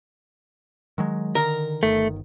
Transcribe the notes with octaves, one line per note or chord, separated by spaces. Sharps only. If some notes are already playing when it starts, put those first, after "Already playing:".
D#3 F#3 G#3
D3 D#3 A#4
G1 D#3 A3